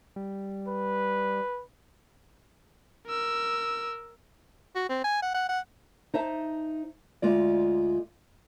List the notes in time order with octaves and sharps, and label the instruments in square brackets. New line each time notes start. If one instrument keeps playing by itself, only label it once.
[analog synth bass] G3
[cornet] B4
[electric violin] A#4 E6
[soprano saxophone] F#4
C4
G#5
F#5
F#5
F#5
[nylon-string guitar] D#4 C5 E5 A5
D2 G#3 F4 D5